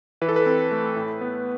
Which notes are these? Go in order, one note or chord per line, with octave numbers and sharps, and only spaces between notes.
E3 B4
A4
B4
C4
A3
A2
B3